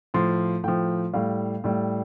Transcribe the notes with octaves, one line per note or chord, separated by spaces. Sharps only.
A2 F3 C6
A2 F3 G5
A2 G3 F5
A2 G3